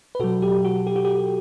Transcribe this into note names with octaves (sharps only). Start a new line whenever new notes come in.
B4
B2 F#3 F#4 A4
G4
F#4
G4
F#4
G4